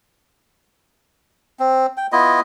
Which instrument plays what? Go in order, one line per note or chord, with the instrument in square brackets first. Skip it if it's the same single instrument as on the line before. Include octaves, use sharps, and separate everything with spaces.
[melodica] C4
G5
B3 E4 F4 D#5